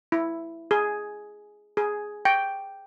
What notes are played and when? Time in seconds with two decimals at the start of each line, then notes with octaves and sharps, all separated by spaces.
0.12 E4
0.71 G#4
1.77 G#4
2.25 G5